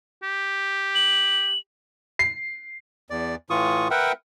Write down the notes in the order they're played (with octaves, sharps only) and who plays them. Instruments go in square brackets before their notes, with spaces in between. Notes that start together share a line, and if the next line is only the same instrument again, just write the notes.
[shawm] G4
[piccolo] F#7
[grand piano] C7
[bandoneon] E2 D5
A2 E3 F4 C#6 D#6
A#4 B4 E5 F#5 G5